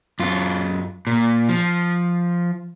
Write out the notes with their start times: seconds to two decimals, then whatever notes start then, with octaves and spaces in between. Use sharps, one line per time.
0.19 F#2 F4
1.07 A#2
1.49 F3